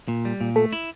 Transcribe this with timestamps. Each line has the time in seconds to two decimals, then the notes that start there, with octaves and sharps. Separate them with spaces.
0.08 A#2
0.25 G3
0.41 A#2
0.56 A3 A4
0.73 E4